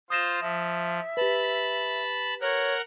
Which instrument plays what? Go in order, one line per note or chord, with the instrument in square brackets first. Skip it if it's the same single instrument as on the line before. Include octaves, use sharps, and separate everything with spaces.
[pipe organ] F4 C5 [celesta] D#6 A#6 E7
[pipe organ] F3 [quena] E5
[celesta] G4 B4 [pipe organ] A5 B5
[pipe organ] A#4 F#5 [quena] C#5